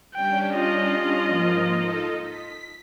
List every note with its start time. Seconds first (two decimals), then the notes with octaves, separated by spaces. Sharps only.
0.15 G3 C#4 D4 G5
0.54 F4 D#5
1.27 G#2 F3 A#3
1.65 D#4 A4
2.22 B6